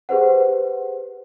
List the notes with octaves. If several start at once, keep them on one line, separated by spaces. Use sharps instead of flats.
G4 G#4 B4 C5 F#5